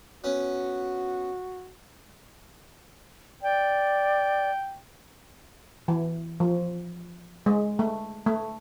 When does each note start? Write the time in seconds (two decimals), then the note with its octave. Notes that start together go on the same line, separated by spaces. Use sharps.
0.24 B3 C#4 F#4
3.43 D5 G5
5.88 E3
6.40 F3
7.46 G#3
7.79 A3
8.27 A3